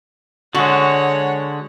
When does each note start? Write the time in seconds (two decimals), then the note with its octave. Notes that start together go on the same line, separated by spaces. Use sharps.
0.55 D3 G#3 F#4 C#5 F#5